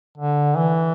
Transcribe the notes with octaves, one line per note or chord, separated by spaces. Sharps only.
D3
E3